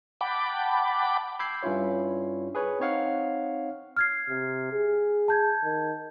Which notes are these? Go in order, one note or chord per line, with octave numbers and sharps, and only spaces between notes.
F#5 G5 A5 B5 D6
B5 D6 E6 G6 G#6 C7
G2 C#4 E4 F4 C#5
G#4 B4 C#5
C4 D#4 C#5 F5 F#5
F6 G#6 C7
C3
G#4
A5 G6 G#6
D#3